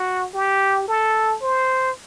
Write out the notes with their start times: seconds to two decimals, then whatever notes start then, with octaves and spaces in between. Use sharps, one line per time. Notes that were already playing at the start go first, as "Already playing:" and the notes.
Already playing: F#4
0.34 G4
0.88 A4
1.42 C5